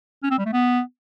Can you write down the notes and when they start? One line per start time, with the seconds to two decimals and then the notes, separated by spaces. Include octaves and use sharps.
0.23 C#4
0.31 C4
0.38 G3
0.46 A3
0.53 B3